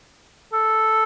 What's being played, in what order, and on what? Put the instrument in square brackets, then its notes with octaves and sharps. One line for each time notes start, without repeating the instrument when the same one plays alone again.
[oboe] A4